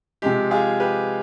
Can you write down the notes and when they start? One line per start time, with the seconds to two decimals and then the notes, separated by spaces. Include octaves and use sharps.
0.22 C3 F3 G#3 G4
0.51 F4 G#4
0.80 G4 B4